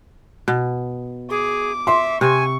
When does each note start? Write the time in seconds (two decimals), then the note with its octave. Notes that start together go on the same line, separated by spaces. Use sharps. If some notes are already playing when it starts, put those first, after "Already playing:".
0.48 B2
1.30 G#4 D6
1.87 E5 C6
2.21 C3 G#5 C#6